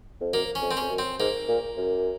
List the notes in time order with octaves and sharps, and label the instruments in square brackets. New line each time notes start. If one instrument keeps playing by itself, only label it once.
[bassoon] F2
[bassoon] F#2 [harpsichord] A#3
[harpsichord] C#4
[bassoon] F2
[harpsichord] C4
[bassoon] F2 [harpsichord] C#4
[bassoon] F#2
[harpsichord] C4
[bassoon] G#2 [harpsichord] A#3
[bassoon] A#2
F#2